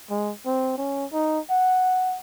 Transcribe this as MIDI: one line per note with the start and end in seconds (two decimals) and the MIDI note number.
0.10 0.33 56
0.46 0.76 60
0.77 1.05 61
1.13 1.40 63
1.50 2.19 78